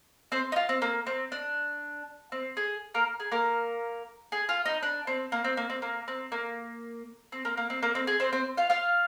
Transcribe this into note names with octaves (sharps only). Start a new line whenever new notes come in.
C4 C5
D#4
F4
C4
A#3
C4
D4
C4
G#4
A#3 A#4
G#4
A#3 A#4
G#4
F4
D#4
D4
C4
A#3
C4
A#3
C4
A#3
C4
A#3
C4
A#3
A#3
C4
A#3
C4
G#4
C4 C5
C4 C5
F4 F5
F4 F5